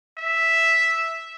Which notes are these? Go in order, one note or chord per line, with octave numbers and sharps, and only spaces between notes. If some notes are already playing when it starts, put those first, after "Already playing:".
E5